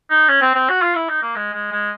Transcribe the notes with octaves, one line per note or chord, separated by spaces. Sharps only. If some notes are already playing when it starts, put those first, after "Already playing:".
D#4
C#4
C4
C4
F#4
F4
E4
D#4
A#3
G#3
G#3
G#3